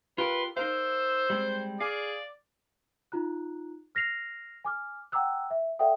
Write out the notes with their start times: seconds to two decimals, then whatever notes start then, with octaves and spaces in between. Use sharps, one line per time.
0.18 F4 G4 A#4 B4 C6
0.57 D#4 A#4 C5 F5 E6
1.30 G3 G#3 C4
1.80 G#4 D5 F5
3.12 D#4 F4 A#5 F#6
3.95 F6 A#6 C7 F7
4.64 G#5 D6 F6
5.12 F#5 G5 A#5 D6 E6 F#6
5.50 E5
5.79 A4 D5 E5 F#5 G5 D#6